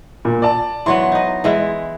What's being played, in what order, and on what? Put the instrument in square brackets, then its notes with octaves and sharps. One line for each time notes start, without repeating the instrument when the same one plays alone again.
[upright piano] A#2
D5 A5
[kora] E3 F#3 B3 [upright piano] C6
[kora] D#4 D#5
E3 G#3 E4